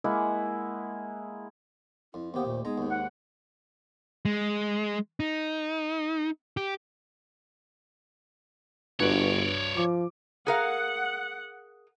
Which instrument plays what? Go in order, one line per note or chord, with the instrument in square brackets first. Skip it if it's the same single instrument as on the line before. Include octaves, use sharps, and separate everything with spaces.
[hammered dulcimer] G#3 A#3 E4 F#5
[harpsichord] F2 [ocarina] E4
[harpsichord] D#2 G4 [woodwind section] A#3 B3 [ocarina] C5
[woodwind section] A#2 A3
[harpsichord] G#3 A#5 [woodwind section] B3 G#4 [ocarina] D#4
[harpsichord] D#2 G#2
[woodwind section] F#5
[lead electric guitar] G#3
D#4
G4
[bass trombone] G1 [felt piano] G2 F#4 B4 [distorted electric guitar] C#5 D5
[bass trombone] F3 [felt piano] D6
[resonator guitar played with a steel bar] G#4 A#4 F5 [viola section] F#5